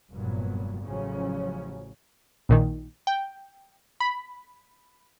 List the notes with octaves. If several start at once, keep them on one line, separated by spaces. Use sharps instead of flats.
F1 G2 A#2 F#3 B3
A1 C#3 F3 F#3 C#4
A#1 A#2 D#3
G5
B5